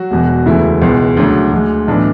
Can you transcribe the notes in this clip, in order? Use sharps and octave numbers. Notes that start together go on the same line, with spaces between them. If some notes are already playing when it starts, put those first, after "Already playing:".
Already playing: F#3 F#4
E1 E2 B2
E1 D2 C#3 E3 A3 E4
C#2 B2 G#3
D2 C#3 F#3 A3 D4
D2 D3 G#3
B1 A2 E3 D4